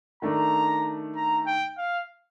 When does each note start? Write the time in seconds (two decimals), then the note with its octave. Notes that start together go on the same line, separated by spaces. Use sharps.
0.22 D#3 A3 D4 A#5
1.16 A#5
1.46 G5
1.78 F5